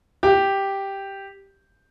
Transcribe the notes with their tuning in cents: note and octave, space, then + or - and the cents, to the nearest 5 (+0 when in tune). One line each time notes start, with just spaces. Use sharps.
G4 +0